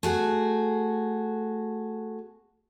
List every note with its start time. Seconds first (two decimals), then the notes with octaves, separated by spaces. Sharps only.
0.03 A3 F#4 G#4